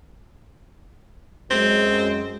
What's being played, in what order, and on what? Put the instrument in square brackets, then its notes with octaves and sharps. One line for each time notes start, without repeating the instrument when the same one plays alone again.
[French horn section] F#2 G#3 [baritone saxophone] C4